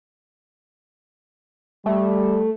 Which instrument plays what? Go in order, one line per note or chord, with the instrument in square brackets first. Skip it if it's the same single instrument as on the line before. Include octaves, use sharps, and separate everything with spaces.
[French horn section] G3 [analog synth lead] A3